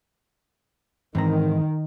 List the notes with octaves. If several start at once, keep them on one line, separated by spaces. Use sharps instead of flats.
G#2 D#3 E3 C4 A#5